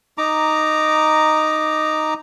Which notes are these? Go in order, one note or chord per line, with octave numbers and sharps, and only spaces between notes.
D#4 A#5 D6